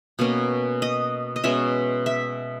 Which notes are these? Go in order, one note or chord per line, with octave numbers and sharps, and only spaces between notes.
B2 A#3 C#4
D#5
D#5
B2 G#3 C#4 E5
E5